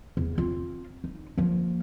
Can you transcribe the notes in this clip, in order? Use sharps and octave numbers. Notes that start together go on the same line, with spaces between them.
E2
C4 F4
D#4
F3 A#3